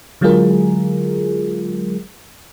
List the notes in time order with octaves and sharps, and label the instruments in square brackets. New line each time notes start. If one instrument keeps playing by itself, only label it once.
[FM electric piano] D3 F#3 G#3 F4 G#4 A#4